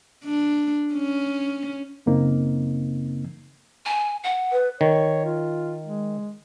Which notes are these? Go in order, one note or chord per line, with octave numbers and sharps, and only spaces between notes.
D4
C#4
F#2 C#3 A#3 C4 D#4
G#5
F#5
B4
D#3 C#5
F4
G#3